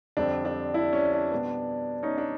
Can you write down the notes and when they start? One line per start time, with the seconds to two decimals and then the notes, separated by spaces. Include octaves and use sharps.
0.17 F2 D3 G3 C4 D4
0.45 D4
0.74 D4 E4
0.93 C#4
1.13 D4
1.31 B2 G3 B3
2.03 C#4 D#4
2.18 D4